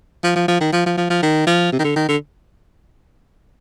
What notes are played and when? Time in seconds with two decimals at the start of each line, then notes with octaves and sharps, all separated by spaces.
0.24 F3
0.36 F3
0.48 F3
0.61 D#3
0.73 F3
0.86 F3
0.97 F3
1.10 F3
1.23 D#3
1.47 F3
1.72 C3
1.79 D#3
1.84 D3
1.96 D#3
2.08 D3